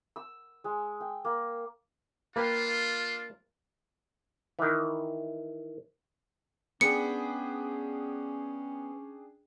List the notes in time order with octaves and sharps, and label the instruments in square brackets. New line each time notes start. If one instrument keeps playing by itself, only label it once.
[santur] E6
G#3
G5
A#3
[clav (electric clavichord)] A#3 B4 G5 [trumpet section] D4 F4
[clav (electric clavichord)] D#3 E3
[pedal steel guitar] B3 [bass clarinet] C#4 [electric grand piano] D4 G#4 G5 [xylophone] C#7